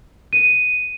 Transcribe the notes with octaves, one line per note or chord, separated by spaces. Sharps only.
D#7